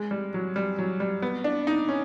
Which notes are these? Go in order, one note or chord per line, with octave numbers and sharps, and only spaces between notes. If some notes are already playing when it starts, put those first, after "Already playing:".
Already playing: G#3
G3
F#3
G3
F#3
G3
B3
D4
D#4
C#4